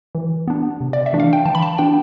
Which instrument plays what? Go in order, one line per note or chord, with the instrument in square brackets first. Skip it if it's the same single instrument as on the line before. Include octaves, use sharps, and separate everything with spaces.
[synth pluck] E3
B3 D4
C3
D5
E5
E3 A3 D4
F5
G5
E3 A5
B5
A5
B3 D4 G5